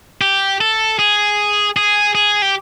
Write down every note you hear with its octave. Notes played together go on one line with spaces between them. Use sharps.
G4
A4
G#4
G#4
G#4
G4